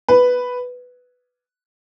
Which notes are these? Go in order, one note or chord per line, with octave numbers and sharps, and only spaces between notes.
B4